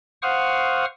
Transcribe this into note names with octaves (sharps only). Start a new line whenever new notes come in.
C5 F5 F#5 C#6 D#6 F6